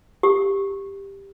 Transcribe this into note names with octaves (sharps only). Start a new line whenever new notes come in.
G4